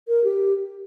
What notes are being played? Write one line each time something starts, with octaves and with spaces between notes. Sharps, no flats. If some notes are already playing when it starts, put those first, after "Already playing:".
A#4
G4